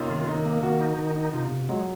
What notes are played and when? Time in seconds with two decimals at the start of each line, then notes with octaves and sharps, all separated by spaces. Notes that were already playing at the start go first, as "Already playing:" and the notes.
Already playing: C3 A#3 C#4 D#4 F4
0.10 D#3
0.28 D#3 D#4
0.45 A#3
0.63 D#3 F#4
0.80 D#4
0.99 D#3
1.16 D#4
1.33 C3 F4
1.51 C3
1.69 F#3 G#3